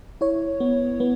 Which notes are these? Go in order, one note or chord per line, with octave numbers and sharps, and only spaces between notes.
E4 C#5
B3
B3